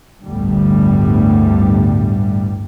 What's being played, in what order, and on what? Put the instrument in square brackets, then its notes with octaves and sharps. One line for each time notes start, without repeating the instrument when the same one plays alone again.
[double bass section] G1 D2 A2 D3 G3